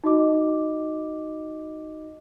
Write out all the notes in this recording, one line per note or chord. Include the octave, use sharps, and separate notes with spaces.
D#4 F#4 D#5 D6